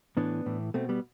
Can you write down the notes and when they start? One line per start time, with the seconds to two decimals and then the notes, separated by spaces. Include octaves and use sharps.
0.17 A2 E3 B3 D4
0.46 A2 E3
0.74 B2 A3 C4
0.89 G3 B3